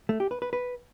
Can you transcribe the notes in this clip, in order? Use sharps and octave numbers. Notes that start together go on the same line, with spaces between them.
A3
G4
B4
B4
B4